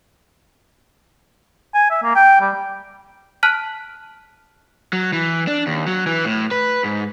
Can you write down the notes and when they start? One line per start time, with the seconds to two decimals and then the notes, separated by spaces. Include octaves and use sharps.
1.75 G#5
1.91 E5
2.03 A#3
2.16 G5
2.41 G3
3.43 A5 F6 F#6 B6 D#7 F#7
4.93 F#3
5.13 E3
5.47 D4
5.67 D#2
5.87 F#3
6.07 E3
6.25 A2
6.51 B4
6.84 G#2